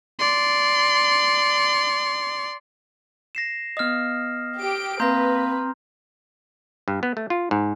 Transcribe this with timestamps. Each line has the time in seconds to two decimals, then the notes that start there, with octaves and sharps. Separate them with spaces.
0.19 D5 C6
3.35 A#6 C7 E7
3.77 B3 D#5 D#6 F6
4.59 G4 D7
5.00 A#3 C4 B4 F5 A#5 C6 G6 A#6
6.88 G2
7.03 B3
7.17 A3
7.30 F4
7.51 G#2